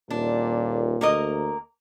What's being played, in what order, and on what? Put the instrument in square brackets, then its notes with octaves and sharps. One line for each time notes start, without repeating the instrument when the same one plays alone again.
[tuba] D#1 [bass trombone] A#2 [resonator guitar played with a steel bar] D4
[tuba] D2 [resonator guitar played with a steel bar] A#3 A#4 D#5